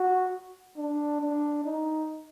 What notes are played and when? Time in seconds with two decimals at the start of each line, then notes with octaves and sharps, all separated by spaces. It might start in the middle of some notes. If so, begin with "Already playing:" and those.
Already playing: F#4
0.77 D4
1.21 D4
1.65 D#4